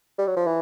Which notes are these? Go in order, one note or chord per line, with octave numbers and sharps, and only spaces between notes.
G3
F#3
F3
E3